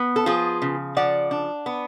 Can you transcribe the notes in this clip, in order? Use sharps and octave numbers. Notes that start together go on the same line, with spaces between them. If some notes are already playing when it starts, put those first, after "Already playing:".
Already playing: B3
A4
F3 F4 G#4
C#3
F3 D5 F#5
D4
B3